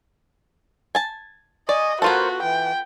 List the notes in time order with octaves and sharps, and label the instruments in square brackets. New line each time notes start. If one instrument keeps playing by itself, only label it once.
[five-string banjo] G#5 A5
[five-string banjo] D5 [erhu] D#5 [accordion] G#5 C#6
[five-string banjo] B3 F4 A4 [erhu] F#4 [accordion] A#4 C5 F#5
[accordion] E3 [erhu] G5